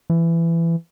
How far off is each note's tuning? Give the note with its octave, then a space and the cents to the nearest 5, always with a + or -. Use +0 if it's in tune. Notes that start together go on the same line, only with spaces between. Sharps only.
E3 +20